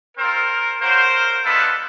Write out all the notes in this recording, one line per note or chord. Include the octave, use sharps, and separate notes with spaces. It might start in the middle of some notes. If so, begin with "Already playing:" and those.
C4 F4 A#4 C5
A#3 C#4 F#4 A#4 C5
G#3 B3 D4 F4 A4 B4